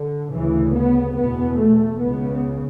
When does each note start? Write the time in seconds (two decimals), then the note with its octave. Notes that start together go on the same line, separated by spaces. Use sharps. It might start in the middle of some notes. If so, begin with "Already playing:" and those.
Already playing: D3
0.34 D2 C#3 E3
0.75 B3
1.18 E2 B2 B3
1.60 A3
2.02 C#2 C#3 B3